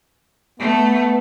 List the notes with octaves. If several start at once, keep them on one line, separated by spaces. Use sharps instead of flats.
A3 B3